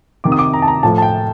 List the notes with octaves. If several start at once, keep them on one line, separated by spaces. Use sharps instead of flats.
C3 D#3 D6
D#6
D6
A#5
A5
A#5
A2 F3 A5
A5
G5